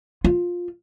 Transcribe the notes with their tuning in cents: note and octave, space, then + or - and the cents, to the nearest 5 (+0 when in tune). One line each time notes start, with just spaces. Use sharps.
F4 +10